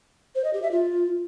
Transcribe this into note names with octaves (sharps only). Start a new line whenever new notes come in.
C5
D#5
G4
E5
F4